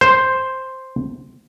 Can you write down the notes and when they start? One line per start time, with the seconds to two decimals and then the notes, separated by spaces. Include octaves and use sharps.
0.01 C5